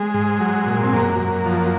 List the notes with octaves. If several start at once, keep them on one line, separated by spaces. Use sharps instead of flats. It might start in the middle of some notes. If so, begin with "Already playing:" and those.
Already playing: G#3
G#2
F#3
A#2
C4
F#2 A#3
F#2
F3